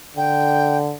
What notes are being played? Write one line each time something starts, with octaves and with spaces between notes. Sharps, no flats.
D3 G5